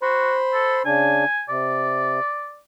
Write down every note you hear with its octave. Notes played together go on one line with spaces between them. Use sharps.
F#4 C5 B5 C6
A4
C#3 D4 G#5
C3 D5